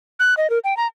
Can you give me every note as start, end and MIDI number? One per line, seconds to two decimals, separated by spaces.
0.20 0.34 90
0.37 0.50 75
0.50 0.59 70
0.64 0.76 79
0.77 0.87 82